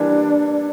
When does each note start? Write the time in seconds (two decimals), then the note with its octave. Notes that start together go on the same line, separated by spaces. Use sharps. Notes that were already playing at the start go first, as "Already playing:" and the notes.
Already playing: E3 G3 A#3 D4